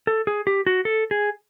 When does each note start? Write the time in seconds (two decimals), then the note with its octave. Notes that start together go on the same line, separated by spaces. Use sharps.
0.07 A4
0.27 G#4
0.47 G4
0.66 F#4
0.85 A4
1.11 G#4